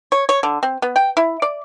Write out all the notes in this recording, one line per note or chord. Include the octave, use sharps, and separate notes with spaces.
C#5
C#5
D3
C4
B3
G5
E4
D5